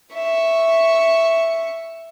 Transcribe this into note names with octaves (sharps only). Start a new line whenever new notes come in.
E5 C#6